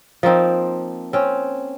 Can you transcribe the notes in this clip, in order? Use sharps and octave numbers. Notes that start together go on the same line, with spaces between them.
F3 A#3 C4 D#4
C4 C#4